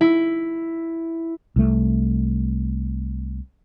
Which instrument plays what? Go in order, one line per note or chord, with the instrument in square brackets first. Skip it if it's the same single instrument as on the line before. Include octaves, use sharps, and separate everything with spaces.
[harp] E4
[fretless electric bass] C2 A3